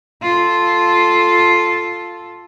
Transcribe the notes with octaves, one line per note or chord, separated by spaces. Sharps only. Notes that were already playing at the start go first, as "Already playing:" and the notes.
F4 A4